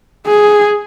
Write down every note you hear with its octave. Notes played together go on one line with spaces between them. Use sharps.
G#4